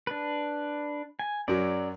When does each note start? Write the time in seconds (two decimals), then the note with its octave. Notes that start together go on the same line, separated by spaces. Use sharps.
0.07 D4 B4
1.19 G#5
1.48 F#2 F#3 D5